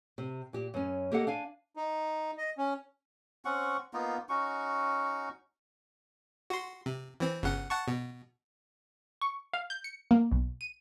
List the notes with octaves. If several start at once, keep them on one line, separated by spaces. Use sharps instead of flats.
C3
A#2 G4
F#2 C#4
A#3 G4 A4 D#5 F#5
D4 F5 G#5
D#4
D#5
C#4
C4 C#4 F#5 C#6
A#3 B3 D#4 F4
C#4 D#4 F#4 C#6
F#4 C6
C3
E3 C4
G1 C#3 F#5
F#5 A5 C#6
B2
C#6
F5
G6
C#7
A#3
B1
D#7